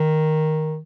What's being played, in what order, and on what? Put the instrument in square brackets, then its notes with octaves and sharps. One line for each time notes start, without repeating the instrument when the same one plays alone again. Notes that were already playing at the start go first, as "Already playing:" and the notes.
Already playing: [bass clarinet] D#3